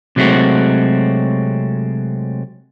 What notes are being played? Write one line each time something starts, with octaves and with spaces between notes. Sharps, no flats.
C3 F#3 G#3 A3 C4 F#4